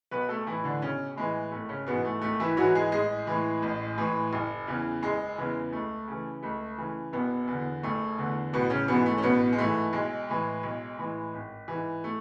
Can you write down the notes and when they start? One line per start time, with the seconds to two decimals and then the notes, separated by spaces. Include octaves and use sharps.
0.11 B1 B3 B4
0.29 A3 A4
0.47 A2 E3 E4
0.64 D3 D4
0.82 B1 C#3 C#4
1.16 A2 E3 G#3
1.52 G#1 A3
1.69 C#3 C#4
1.86 G#2 B2 E3 B3
2.05 A3
2.22 G#1 A3
2.40 E3 E4
2.57 G#2 E3 F#3 F#4
2.75 G#3 G#4
2.92 A1 G#3 G#4
3.27 A2 E3
3.62 A1
3.98 A2 E3
4.33 F#1
4.67 E2 C#3 E3
5.02 F#1 G#3 G#4
5.38 E2 C#3 E3
5.72 C#2 A3
6.07 C#3 E3
6.43 C#2 A3
6.78 C#3 E3
7.13 F#1 B2 B3
7.48 E2 D3
7.83 F#1 A3
8.18 E2 D3
8.53 A1 B2 B3
8.70 C#3 C#4
8.88 G#2 B2 E3 B3
9.06 A3
9.18 C#4
9.22 A1 B2 B3
9.52 G#3
9.58 G#2 E3 A3
9.93 B1 G#3
10.29 A2 E3
10.63 B1
10.98 A2 E3
11.34 G#1
11.68 G#2 E3
12.04 A3